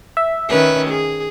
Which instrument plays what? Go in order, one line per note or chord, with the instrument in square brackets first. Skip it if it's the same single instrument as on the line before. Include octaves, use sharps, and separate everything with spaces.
[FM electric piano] E5
[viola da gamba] D#3 C#4 B4
G#4